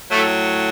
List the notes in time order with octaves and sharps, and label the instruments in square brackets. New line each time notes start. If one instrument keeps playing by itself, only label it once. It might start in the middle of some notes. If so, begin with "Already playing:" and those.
[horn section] A2 F#3 A3